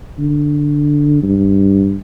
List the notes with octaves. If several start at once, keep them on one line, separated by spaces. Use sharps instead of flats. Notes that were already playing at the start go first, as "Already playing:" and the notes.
D3
G2